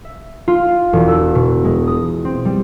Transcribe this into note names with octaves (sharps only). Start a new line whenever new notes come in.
E5
F4
E1
E6
B2
G#3
D#6
C4
G3